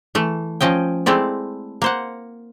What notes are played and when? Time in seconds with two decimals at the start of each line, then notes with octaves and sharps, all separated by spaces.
0.15 E3 A3
0.61 F3 C#4 D#5 G5
1.06 G#3 A3 C4 E4 D5
1.82 A#3 C5 F#5